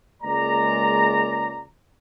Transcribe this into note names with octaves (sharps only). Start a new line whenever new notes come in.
C#2 G#3 A#3 D5 A#5